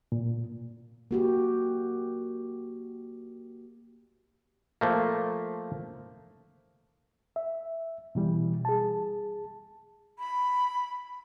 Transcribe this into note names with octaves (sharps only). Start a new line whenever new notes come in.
A#2
A#3 F#4 G4
F3 A3 A#3
E5
B2 E3 G3
G#4 A5
B5